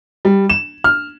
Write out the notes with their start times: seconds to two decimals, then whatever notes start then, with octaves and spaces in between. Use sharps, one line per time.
0.25 G3
0.50 E7
0.84 F6